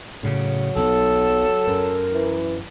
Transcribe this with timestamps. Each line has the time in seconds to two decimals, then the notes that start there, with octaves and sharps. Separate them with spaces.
0.23 A2 C#3 F#3
0.76 B1 A4
1.67 F#2 A#4
2.14 E3